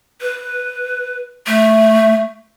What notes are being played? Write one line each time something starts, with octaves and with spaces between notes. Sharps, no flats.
B4
A3